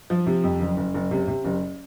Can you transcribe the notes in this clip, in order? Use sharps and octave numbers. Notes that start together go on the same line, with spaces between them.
F3
C3
F2
F#1
F#1
F#1
C3
C3
F#1